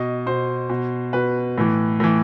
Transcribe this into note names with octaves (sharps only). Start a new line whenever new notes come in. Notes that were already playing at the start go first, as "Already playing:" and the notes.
Already playing: B2 D#5
B2 C5
B2
B2 B4
A2 E3
A2 E3